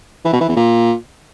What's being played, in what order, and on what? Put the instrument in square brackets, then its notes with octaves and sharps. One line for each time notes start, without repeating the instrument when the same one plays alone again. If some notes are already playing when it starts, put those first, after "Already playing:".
[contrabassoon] E3
B2
E3
E2
A#2